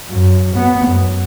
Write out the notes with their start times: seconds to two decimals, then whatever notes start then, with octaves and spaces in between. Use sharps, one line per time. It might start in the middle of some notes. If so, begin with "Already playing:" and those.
0.10 F#2
0.56 B3
0.86 F#2